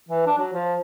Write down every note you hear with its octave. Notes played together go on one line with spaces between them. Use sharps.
E3
D4
F#3
F3